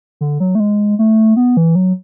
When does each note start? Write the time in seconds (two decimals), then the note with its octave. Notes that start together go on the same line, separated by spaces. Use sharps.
0.21 D3
0.40 F#3
0.55 A3
0.60 G#3
0.99 A3
1.36 B3
1.57 E3
1.75 F#3